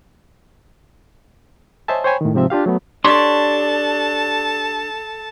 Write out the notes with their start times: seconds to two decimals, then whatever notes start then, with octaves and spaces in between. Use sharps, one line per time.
1.88 C5 C#5 D#5 E5 G#5 A5
2.04 C5 C#5 G5 G#5 B5 C#6
2.21 A2 D#3
2.34 G#2 C3 F3 C4 E5
2.50 D4 F4 G4 F5
2.66 F#3 A3 B3
3.05 D4 G4 A4 C#5 A5 C6